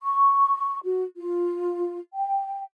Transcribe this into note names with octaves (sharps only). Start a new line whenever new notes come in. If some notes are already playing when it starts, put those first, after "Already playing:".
C#6
F#4
F4
G5